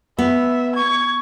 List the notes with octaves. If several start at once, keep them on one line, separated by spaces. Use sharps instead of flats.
B3 E5
C#6 G#6